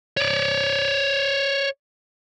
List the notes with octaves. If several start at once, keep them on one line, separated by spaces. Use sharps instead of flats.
C#5 D5